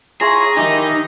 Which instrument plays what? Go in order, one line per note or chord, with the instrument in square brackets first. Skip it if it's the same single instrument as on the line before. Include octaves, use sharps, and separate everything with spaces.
[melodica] E4 F4 C#5 [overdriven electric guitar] G#4 [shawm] A#5
[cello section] D#3 [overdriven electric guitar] D#4 [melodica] E4 G4